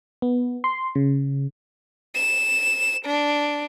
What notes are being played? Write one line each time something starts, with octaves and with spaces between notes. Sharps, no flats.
B3
C6
C#3
E7
D4